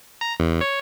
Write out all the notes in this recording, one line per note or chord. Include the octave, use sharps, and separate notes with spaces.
A#5
E2
C#5